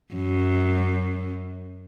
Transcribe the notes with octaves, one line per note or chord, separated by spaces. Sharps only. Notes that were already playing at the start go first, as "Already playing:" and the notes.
F#2